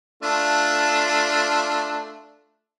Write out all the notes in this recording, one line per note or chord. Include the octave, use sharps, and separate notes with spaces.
A3 D4 F4